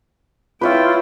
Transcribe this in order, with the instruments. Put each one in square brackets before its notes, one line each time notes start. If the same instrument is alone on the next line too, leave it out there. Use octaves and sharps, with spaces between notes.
[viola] E4 G5 [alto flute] F4 [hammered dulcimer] B4 C#5 E5